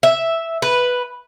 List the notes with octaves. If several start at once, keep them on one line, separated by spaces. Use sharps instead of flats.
E5
B4